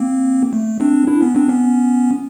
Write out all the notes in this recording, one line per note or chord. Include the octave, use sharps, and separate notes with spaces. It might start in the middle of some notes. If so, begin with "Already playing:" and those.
Already playing: A#3 C4
A3
C4 D4
D4 E4
B3 C#4
C4 D4
B3 C#4